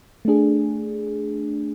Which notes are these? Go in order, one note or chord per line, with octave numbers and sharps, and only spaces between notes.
A3 D4 G#4